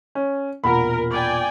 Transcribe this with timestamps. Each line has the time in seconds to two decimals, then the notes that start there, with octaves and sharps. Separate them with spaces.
0.15 C#4
0.64 E1 A#2 A#4 F#5 B5
1.11 D5 G5 G#5